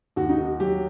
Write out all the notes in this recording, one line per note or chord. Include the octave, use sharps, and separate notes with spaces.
D#2 F#4
D#4
F#4
F#3 G4